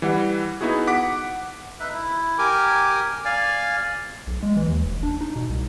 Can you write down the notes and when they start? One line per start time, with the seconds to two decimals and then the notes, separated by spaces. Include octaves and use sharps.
0.02 E3 G3 F#5
0.61 B3 D#4 E4 F#4 G#4
0.87 F#5 D6 B6
1.80 D#4 B4 E5
1.94 E4
2.38 G4 A#4 G#5 D6
3.25 D5 F5 G#5
4.27 B1
4.43 G#3
4.57 E3
4.68 D#2
4.84 F1
5.03 D4
5.21 D#4
5.36 B2
5.49 C2